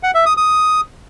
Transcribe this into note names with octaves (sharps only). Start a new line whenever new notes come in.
F#5
E5
D#6
D#6